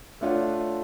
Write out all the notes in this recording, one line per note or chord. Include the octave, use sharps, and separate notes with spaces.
A3 D4 F4 C#5 F#5